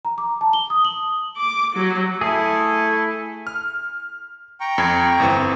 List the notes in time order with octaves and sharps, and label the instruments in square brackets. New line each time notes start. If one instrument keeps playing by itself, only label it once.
[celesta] A#5
D6
A5
G7
D#6
F#7
[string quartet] D6
F#3
[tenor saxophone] A3 [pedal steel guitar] E4 G#4
[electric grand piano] F6
[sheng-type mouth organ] G5 A#5 C#6
[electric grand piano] F2 G#6
G1 E3 C4